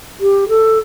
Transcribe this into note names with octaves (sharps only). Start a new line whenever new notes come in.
G4
A4